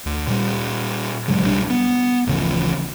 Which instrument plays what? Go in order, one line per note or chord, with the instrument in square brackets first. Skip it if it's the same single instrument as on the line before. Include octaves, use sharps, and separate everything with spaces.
[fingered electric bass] D2
A#2 G3
G2 C#3 F#3 G#3
B1 G3 A3 D4
B3
D1 A1 C#3 F3